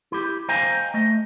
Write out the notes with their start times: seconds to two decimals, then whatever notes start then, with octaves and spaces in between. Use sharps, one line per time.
0.12 E4 G4
0.49 C5 D#5 F5 G5 G#5 A#5
0.94 A3 D#5